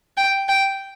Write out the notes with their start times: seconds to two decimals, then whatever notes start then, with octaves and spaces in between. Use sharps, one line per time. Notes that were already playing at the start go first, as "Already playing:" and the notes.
0.17 G5
0.48 G5